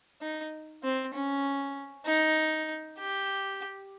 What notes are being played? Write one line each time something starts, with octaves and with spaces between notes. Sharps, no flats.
D#4
C4
C#4
D#4
G4